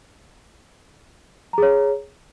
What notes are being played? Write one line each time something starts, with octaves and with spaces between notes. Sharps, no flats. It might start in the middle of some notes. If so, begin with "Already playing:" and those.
G#4 C#5 A#5